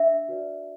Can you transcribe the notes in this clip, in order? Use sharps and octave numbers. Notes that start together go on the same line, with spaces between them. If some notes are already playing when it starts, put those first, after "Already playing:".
Already playing: D4 E5
F#4 B4 D5